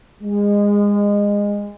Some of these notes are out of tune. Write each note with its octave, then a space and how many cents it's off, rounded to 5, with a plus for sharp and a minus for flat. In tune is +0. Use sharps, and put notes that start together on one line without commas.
G#3 -25